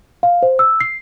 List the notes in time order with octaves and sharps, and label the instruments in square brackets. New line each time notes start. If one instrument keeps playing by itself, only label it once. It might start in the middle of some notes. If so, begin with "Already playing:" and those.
[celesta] F5
C5
E6
C7